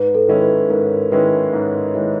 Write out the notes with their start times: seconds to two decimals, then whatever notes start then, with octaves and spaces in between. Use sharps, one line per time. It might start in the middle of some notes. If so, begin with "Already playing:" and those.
Already playing: G#2 B4
0.15 A4
0.28 D#3 G#3 C#4 E4
0.42 B4
0.70 G#2 A#4
1.12 D#3 G#3 C#4 E4 B4
1.53 G#2
1.95 D#3 G#3 C#4 E4